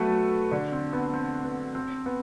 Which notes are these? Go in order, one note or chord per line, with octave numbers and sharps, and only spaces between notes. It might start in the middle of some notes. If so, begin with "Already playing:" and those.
Already playing: F#3 A3 B3 F#4 A4 B4
D3 D4
C4
B3
C4
B3
C4
B3